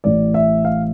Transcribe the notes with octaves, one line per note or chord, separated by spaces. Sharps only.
A1 A2 E3 D5
E5
F5